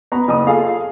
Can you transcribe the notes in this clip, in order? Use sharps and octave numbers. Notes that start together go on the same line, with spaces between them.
B3 A#5
F#1 D#6
F4 G#4 A4 F5